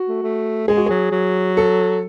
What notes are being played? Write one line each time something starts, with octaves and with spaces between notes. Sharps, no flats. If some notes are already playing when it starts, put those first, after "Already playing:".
Already playing: F#4
A3
A3
G#3 G#4
F#4
F#3 G#4
F#3
A4